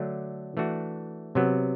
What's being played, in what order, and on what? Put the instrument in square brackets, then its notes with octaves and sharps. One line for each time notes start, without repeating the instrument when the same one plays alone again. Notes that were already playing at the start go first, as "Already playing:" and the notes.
Already playing: [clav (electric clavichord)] D3 F#3 A3 D4
E3 A3 D4 F#4
C3 F#3 B3